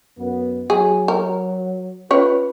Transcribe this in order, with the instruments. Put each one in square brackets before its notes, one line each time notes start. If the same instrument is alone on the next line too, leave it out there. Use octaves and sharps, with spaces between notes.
[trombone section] F#2 B3
[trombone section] F#3 [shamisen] G#4
[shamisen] A#4
[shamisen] C#4 C#5 [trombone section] F4 B4